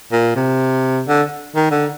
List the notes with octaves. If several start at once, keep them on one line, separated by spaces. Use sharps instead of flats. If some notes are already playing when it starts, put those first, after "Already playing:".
A#2
C3
D3
D#3
D3